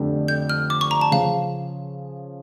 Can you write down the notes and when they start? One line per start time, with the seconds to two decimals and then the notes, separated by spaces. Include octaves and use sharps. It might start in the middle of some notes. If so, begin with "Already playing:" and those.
Already playing: F2 D3 A3 D4 G4
0.28 G6
0.50 F6
0.70 D6
0.81 C#6
0.91 A#5
1.01 A5
1.11 C#3 F3 C#4 F5